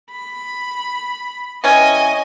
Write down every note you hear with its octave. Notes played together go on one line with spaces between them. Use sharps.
B5
C3 E3 C#4 D#5 G#5